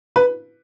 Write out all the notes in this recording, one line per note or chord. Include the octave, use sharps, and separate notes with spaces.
B4